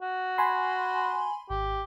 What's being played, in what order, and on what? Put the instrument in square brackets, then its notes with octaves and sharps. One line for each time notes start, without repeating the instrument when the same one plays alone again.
[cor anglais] F#4
[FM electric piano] G#5 B5 C6
[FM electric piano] G#1 [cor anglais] G4